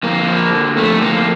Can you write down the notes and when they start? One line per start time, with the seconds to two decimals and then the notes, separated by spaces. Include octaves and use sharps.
0.03 F2 A#3
0.28 F3
0.53 D3
0.77 F2 A3
1.01 F2 A#3